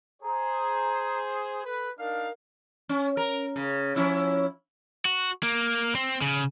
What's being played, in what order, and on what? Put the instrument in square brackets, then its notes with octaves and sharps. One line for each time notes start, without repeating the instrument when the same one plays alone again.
[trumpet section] G#4 C5 [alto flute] A#5
[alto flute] A4 [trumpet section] B4
[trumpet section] D4 D#4 F5 [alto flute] A#4
[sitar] C#4
A#4
C#3
F3 C#4 E4
[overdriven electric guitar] F#4
A#3
C4
C#3